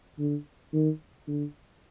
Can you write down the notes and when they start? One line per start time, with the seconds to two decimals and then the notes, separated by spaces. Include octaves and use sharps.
0.19 D3
0.73 D#3
1.28 D3